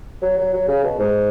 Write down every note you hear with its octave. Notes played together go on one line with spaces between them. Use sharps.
F#3
F#3
F#3
C#3
B2
G#2